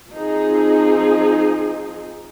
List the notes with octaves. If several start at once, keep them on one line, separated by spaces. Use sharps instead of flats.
F3 C4 D#4 G#4